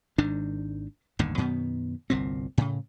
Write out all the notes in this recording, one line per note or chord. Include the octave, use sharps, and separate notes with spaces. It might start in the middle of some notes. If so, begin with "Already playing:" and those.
G#1 G#2 D#3 D4
G1 D#2 A2 D3
F#2 B2 D#3 B3
G1 C2 A#2 C4
A2 C#3